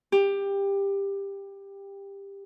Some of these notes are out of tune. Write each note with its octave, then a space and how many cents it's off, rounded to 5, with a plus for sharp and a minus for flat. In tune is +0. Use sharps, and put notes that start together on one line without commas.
G4 +15